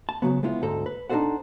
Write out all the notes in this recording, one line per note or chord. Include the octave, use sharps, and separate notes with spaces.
A5
C#3 E3 F#3 B3
G#3 B3 E4 F4
D2 G#2 A4 A#5
B4
D4 D#4 F4 A4 C5 F#5